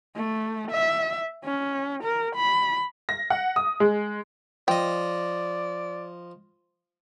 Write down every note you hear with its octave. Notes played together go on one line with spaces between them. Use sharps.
A3
E5
C#4
A#4
B5
A#6
F#5
D#6
G#3
F3 D5 D#5 G5